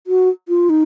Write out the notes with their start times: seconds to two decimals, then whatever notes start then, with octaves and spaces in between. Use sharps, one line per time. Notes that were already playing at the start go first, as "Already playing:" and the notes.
0.07 F#4
0.49 F4
0.70 D#4